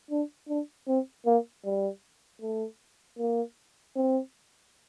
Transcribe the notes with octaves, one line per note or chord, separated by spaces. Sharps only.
D4
D4
C4
A#3
G3
A3
A#3
C4